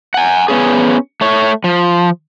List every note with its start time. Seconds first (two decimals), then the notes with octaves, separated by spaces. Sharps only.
0.14 F#5 G#5
0.48 B3 C#4 G#4
1.21 A3 C#5
1.64 F3